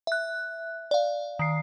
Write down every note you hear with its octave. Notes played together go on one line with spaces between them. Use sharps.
E5 F#6
D5 F5
D#3 C7